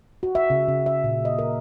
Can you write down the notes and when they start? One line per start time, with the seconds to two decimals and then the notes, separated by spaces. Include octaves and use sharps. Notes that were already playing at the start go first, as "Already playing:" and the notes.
0.23 F#4
0.35 E5
0.50 C#3
0.68 C#3
0.86 E5
1.04 A#2
1.25 D#5
1.39 A#4